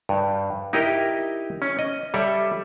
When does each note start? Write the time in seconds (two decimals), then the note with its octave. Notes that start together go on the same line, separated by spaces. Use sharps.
0.09 G2
0.73 D#4 E4 G4 A#4 D#5 G5
1.62 C#4
1.79 D#5
2.14 G3 A4 C#5 D5 E5